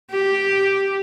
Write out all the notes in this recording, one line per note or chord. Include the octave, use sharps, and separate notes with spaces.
G4